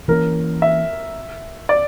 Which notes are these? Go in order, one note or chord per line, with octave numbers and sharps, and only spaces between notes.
E3 A#3 C#4 A#4
E5
D5